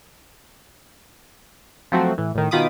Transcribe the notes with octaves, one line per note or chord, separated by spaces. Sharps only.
F3 F#3 A3 C4 F#4
A2 E3
A2 D#3
B2 D#3 F4 B5 D6 D#6